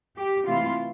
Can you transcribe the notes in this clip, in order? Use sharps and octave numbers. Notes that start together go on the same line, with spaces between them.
G4
C3 E3 A3 C4 E4 F4